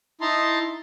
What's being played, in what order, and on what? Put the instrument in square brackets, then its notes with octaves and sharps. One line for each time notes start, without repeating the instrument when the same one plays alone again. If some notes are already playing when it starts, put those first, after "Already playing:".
[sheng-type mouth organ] D#4 E4 A5 A#5 C6